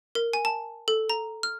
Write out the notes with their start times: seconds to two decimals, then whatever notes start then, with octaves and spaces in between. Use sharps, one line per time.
0.15 A#4
0.33 G#5
0.45 A5
0.88 A4
1.10 A#5
1.43 F6